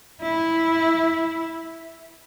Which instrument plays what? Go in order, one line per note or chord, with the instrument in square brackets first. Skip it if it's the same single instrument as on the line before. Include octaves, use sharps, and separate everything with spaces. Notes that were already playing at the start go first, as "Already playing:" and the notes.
[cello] E4